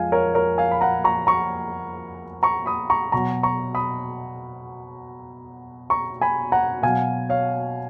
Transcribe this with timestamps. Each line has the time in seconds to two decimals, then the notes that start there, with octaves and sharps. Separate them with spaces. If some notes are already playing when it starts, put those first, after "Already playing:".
Already playing: F2 F3 G#3 F5 G#5
0.12 A#4 C#5
0.34 A#4 C#5
0.58 F5 G#5
0.71 B5
0.81 F#5 A#5
1.04 A#5 C#6
1.27 A#5 C#6
2.43 A#5 C#6
2.66 B5 D#6
2.90 A#5 C#6
3.12 B2 F#3 A#5 C#6
3.43 A#5 C#6
3.75 B5 D#6
5.90 A#5 C#6
6.21 G#5 B5
6.52 F#5 A#5
6.83 B2 F#3 F5 G#5
7.29 C#5 F5